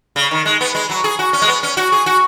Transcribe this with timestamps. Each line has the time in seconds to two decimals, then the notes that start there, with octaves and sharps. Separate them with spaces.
0.16 C#3
0.31 D#3
0.45 G#3
0.61 B3
0.75 G#3
0.90 F#3
1.04 G#4
1.19 F#4
1.33 C#4
1.42 G#3
1.48 B3
1.63 C#4
1.77 F#4
1.92 G#4
2.06 F#4